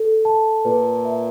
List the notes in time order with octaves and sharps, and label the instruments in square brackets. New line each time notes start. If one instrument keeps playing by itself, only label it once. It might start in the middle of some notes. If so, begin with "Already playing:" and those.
Already playing: [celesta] A4
A5
[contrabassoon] A#2 [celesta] B4
[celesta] E5